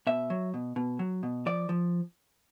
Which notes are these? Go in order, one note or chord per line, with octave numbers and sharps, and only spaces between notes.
B2 E5
F#3
B2
B2
F#3
B2
F3 D5
F3